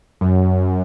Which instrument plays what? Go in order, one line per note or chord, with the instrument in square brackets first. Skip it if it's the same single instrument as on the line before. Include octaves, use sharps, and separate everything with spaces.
[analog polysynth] F#2